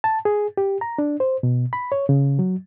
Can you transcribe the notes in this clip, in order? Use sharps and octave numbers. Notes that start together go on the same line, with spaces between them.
A5
G#4
G4
A#5
D4
C5
B2
B5
C#5
C#3
F#3